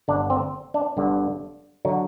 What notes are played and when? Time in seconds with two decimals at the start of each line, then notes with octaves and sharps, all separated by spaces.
0.08 G1 G2 D3 D4
0.30 C4
0.74 D4
0.97 G1 G2 D3
1.85 D3 F#3